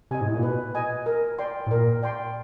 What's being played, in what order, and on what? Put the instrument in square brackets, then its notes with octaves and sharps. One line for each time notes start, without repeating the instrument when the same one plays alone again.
[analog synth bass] C3 [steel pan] D#5 G#5
[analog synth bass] G#2
A2
A#2
[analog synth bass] B2 [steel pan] B4
[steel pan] D#5 G#5
A#4
D5 G5 C6
[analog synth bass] A2
[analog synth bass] A#2 [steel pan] A#4
[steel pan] D5 G5 C6